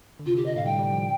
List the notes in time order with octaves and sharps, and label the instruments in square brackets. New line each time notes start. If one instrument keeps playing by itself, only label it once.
[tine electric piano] D3
[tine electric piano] C3 [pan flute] F4
[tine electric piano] D3 [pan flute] G4
[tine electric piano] D3 [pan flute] D#5
[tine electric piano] A2 [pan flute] F5
[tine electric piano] G3 [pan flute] G5
[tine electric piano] G3
F3